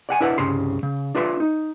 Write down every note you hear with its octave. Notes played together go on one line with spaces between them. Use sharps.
D5 F#5 G#5
D4 E4 B4 F#5
C2 G2 C#3 C6
C#3
D4 F4 B4 E5 A#5 C6
D#4